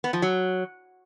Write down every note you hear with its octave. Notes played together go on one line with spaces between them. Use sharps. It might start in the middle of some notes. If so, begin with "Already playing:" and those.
B3
F3
F#3